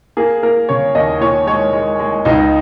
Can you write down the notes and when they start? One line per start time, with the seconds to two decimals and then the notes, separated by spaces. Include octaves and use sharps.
0.17 A#3 G#4
0.43 A#3 A#4
0.69 C#3 C#5
0.95 D#2 D#5
1.21 A#2 C#5
1.47 G#3 C#5
1.73 G#3
2.00 G#3
2.25 C#2 D#4